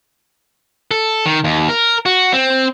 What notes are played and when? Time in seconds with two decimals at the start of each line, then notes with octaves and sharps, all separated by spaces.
0.91 A4
1.26 D#3
1.44 D#2
1.69 A#4
2.06 F#4
2.33 C4